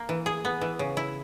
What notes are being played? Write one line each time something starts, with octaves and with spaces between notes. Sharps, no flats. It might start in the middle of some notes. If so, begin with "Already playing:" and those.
Already playing: A#3
E3
G#4
B3
E3
C#3
E4